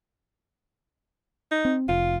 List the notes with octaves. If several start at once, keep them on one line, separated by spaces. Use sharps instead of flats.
D#4
C4
F1 F4